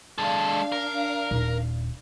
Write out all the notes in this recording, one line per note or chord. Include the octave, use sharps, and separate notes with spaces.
G#3 D4 A4 F5
A#4
D#1